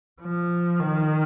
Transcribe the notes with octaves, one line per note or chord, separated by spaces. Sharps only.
F3
D#3